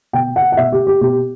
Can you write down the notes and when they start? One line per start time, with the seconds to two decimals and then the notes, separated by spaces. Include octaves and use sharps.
0.13 B2 G5
0.36 F#5
0.52 F#5
0.57 B2 E5
0.72 G4
0.87 G4
1.01 B2 G4